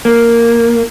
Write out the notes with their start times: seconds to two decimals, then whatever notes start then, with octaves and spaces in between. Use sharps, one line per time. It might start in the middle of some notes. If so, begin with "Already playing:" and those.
0.05 A#3